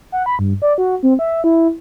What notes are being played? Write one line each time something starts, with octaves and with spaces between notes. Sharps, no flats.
F#5
B5
G2
D5
F#4
C4
E5
E4